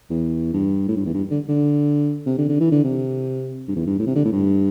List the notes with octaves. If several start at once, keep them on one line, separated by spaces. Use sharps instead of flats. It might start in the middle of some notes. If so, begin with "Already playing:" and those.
E2
G2
A2
G2
E2
G2
D3
D3
C3
D3
D3
E3
D3
C3
G2
E2
G2
A2
C3
D3
A2
G2